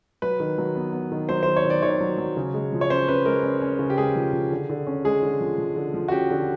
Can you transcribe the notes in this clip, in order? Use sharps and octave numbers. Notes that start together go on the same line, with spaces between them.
F#3 B4
D#3
F#3
B3
B3
D#3
F#3 C5
D#3 C5
C#5
D#3
D5
D#3 C#5
F#3
F#3
C#3
G#3
F3
C#5
C#4 C5
C#4 B4
G#3 A#4
C#4
C#4
C#3
G4
G#3 G#4
F3
F3
D3
D3
C#4
G#3 G#4
D3
F3
F3
D3
F3
F#4
C#4 G4
D3